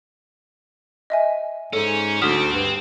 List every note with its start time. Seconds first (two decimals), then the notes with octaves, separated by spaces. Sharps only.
1.10 D#5 E5 G#5
1.73 G#2 C#4 A4
2.22 D2 C4 D#6 F6 B6
2.54 G2